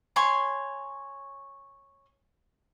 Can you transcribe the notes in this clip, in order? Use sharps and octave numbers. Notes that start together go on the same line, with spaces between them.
C#5 G#5 C6